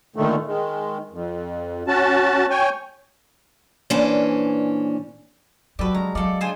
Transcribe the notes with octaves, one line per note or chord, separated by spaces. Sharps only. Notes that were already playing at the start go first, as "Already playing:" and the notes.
A#2 D3 D#3 A3
D#3 G#3
F2
C#4 F#4 A5
C#5 G5 G#5
A#2 E3 C#4 D4 C5
F#3 F#4 G4 A4 B4 D5
G#3 C#4 A#5
F#3 A4 D5 D#5 F5 C#7
G#3 D4 F4 G#4 C5 G#5